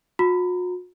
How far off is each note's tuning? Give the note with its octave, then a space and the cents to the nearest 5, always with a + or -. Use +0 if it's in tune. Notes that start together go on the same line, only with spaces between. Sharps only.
F#4 -45 A#5 +0